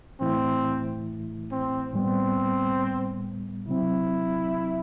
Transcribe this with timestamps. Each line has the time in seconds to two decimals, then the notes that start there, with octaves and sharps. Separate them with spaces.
0.20 A2 E3 A3 C4 E4
1.51 C4
1.94 A2 G3 B3 C4
3.68 C3 F#3 C4 E4